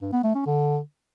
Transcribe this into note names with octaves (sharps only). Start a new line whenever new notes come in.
G2
B3
A3
C#4
D3